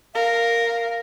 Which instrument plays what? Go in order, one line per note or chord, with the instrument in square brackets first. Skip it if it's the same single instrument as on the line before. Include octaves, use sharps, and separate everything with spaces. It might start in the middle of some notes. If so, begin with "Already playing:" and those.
[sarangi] A#4 [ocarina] F5